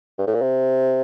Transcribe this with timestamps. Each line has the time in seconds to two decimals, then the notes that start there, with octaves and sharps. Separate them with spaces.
0.18 G2
0.27 A2
0.35 A#2
0.42 C3